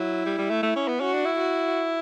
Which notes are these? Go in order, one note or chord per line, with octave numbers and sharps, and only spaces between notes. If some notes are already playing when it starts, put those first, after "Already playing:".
Already playing: F#3 E4
G3
G3
A3
A3
C#4
B3
C#4 F#4
D4
E4
F#4